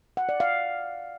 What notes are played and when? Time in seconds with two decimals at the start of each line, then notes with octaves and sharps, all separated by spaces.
0.17 F#5
0.29 D5
0.40 F5